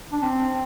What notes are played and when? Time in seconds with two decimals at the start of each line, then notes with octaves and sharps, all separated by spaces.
0.12 D4
0.22 C4